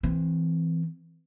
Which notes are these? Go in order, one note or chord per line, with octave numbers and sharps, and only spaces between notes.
E3 C4